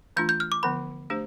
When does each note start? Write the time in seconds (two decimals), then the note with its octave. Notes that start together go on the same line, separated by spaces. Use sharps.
0.16 E3 A3 D4 F4 G6
0.29 G6
0.40 F6
0.52 D6
0.63 D3 F3 B3 B5
1.10 A3 D4 G4 C5